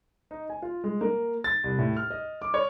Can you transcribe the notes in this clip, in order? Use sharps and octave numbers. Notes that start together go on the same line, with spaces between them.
D#4
G#5
F4
G#3
A#3
A6
C2
A2
F6
D#5
D6
C#5